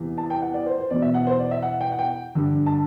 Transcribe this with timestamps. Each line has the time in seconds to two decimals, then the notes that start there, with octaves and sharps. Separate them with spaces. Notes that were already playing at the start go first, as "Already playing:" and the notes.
Already playing: E2 C3 E3
0.18 A5
0.30 G5
0.42 F#5
0.54 D5
0.66 C5
0.78 C5
0.90 E2 B2 D5
1.02 E5
1.14 F#5
1.27 C5
1.39 D5
1.51 E5
1.62 F#5
1.81 G5
1.92 F#5
1.99 G5
2.35 G2 D3
2.66 A5